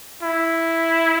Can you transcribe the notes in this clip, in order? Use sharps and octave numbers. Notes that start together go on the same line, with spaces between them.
E4